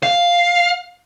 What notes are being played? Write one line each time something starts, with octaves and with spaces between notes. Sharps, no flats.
F5